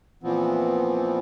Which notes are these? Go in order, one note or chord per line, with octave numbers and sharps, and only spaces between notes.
A#2 E3 F3 B3 C4